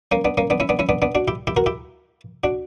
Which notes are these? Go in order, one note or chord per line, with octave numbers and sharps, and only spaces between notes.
A#3 C#4
B3 D4
A#3 C#4
B3 D4
C#4 E4
B3 D4
C#4 E4
B3 D4
B3 D4
D4 F#4
E4 G4
E4 G4
F#4 A#4
E4 G4
D4 F#4